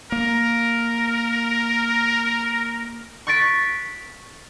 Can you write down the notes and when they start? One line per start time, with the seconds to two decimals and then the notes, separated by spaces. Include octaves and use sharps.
0.12 A#3 A#4
3.27 C#6 F#6 A6 B6 D7